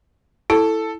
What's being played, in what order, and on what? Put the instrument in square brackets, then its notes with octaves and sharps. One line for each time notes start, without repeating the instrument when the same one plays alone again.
[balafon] E4 [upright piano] A4